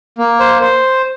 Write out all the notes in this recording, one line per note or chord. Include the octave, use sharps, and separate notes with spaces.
A#3
C5
C5